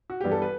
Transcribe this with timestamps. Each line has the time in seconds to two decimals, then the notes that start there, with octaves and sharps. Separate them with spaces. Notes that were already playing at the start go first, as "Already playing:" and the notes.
0.10 F#4
0.21 G2 E3 G3 B3 G4
0.32 A4
0.42 B4